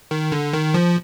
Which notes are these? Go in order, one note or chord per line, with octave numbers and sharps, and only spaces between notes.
D#3
D3
D#3
F3